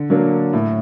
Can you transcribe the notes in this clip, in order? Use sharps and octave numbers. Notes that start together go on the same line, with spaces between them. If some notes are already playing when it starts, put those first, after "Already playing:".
Already playing: D3
F#3 A#3 D4
A2